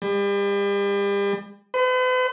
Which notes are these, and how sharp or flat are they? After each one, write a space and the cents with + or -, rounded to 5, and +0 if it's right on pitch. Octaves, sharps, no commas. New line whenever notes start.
G3 +35
B4 +45